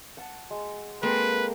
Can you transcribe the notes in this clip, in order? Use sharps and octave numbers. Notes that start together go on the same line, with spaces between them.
F#5 A5
G#3
G#3 A#3 C4 A4 B4 G5